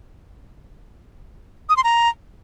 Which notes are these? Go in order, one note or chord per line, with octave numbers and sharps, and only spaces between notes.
D#6
C6
A#5